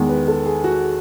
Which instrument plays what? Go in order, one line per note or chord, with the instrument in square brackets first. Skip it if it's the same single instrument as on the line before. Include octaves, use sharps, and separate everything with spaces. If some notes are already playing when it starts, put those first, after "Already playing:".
Already playing: [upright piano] E2 D#3 G#3
[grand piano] B4
A4
G#4
F#4